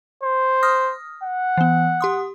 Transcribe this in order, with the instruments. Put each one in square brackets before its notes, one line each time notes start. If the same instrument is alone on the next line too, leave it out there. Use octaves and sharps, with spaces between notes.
[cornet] C5
[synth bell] D#6 F6 A#6
[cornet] F#5
[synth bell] E3 B3
G4 C6 D#6